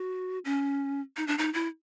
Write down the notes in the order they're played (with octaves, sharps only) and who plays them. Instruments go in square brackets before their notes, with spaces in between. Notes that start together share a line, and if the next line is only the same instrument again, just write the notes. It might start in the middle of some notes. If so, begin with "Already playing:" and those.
Already playing: [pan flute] F#4
C#4
D#4
D4
D#4
E4